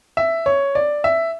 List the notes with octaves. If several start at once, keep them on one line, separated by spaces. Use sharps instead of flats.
E5
C#5
D5
E5